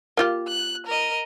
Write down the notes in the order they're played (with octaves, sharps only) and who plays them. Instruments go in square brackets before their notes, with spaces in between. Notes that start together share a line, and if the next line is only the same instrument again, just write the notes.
[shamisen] A#3 F4 G4
[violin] F#6
A#4 D#5